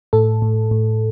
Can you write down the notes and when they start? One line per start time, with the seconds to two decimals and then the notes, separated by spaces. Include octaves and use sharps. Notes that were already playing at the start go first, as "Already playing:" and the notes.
0.13 A2 A4
0.42 A2
0.71 A2